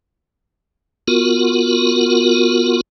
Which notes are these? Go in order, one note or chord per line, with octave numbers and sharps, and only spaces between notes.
B3 F4 F#4 A#4